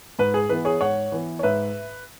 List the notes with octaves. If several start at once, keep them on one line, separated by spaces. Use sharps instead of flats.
G#2 B4
G#4
E3 B3 E4 B4
G#4 C#5
G#2 C#5 F#5
E3 B3 E4
C#5
G#2 B4 E5